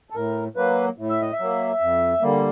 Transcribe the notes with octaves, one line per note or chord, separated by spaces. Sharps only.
A4
A2 A#4
F#3 A#3 B4
A2
E5
D#5
E5
F#3 A#3
F2
D3 G3 A#3